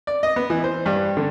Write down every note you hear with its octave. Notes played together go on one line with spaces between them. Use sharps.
D5
D#5
B3
E3
C5
G2
D3